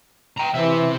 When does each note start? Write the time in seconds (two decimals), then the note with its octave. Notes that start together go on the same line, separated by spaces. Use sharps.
0.37 G5 A#5
0.54 C3 E3 E5